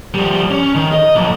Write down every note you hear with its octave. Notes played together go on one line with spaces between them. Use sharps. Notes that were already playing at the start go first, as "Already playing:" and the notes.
F3 G3
C#4
D#3
D#5
B1 F2